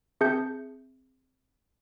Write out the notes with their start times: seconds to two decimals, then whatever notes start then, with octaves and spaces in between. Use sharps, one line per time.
0.21 C4 G#4 E5 A5 G6 C#7